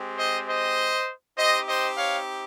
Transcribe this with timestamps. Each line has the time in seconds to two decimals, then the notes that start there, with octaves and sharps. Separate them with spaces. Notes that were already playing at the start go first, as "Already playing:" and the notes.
Already playing: G#3 C4 G4
0.18 C5 D#5
0.47 C5 D#5
1.37 C4 D#4 G4 C5 D#5
1.67 C5 D#5
1.97 C#5 F5